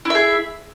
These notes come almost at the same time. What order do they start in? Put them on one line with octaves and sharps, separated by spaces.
E4 E5 G#4